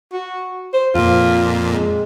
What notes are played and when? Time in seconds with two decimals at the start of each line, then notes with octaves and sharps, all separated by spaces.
0.13 F#4
0.73 C5
0.95 F2 A#2 F4
1.72 G#3